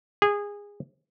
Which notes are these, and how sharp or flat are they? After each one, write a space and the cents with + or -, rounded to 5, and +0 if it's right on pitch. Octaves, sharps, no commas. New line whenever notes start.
G#4 -20